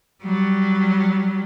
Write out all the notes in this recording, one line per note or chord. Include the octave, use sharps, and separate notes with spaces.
F#3 G3